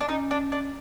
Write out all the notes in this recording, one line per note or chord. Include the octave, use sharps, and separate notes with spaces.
D4
C#4 D#4
D4
D4